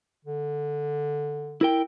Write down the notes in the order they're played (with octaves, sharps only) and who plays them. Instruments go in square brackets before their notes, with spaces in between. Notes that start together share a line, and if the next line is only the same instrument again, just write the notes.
[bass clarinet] D3
[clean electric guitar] E4 A#4 G5